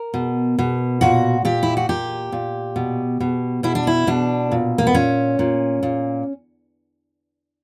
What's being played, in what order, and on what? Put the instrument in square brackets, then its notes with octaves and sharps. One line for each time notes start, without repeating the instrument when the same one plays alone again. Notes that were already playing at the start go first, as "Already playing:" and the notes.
Already playing: [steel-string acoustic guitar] A#4
B2
B2
A#2 F#4
A#2 G4
E4
F#4
A#2 G4
A#2
B2
B2
B2 E4
D4
E4
B2 D4
A#2
A#3
B3
A#2 C#4
A#2
A#2